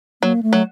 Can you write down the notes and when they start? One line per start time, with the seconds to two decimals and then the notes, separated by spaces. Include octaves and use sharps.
0.22 F#3 A#3
0.43 A3
0.53 F#3